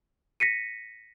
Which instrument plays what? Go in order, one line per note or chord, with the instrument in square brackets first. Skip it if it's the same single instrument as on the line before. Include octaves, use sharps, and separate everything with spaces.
[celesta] A#6 B6 C#7 D#7